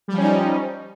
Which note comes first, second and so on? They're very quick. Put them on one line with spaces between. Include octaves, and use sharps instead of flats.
G3 F3 C#4 D#4